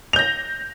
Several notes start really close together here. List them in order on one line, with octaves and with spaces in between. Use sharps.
F7 G6 A#6